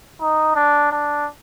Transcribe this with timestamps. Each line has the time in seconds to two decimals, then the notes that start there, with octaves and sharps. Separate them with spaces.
0.21 D#4
0.56 D4
0.91 D4